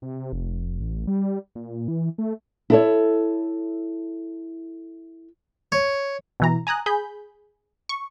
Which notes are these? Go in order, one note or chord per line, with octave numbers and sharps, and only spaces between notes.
C3
F1
A1
G3
A#2
E3
A3
E4 A4 C#5
C#5
B2 E3 A#5
G#5 A#5 D#6 F#6
G#4 B5 G6
C#6